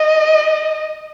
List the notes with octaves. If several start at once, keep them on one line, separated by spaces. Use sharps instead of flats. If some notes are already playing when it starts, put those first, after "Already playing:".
Already playing: D#5